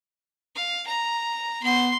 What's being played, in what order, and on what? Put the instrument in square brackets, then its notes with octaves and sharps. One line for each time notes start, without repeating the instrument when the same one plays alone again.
[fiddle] F5
A#5
[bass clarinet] B3 [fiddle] C6